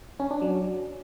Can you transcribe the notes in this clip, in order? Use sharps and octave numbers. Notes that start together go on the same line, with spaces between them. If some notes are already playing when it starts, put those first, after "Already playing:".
C#4
D4
F#3